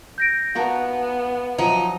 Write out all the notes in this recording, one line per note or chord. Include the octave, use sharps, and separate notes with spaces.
G6 A#6 D7
B3 D#4 F#4 A#4 F5 A5
F3 F#3 D#4